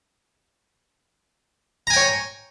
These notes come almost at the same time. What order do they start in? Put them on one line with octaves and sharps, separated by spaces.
A#5 G#5 G5 C#5